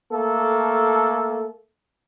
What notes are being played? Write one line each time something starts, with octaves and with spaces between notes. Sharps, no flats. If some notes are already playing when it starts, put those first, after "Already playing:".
A3 A#3 A4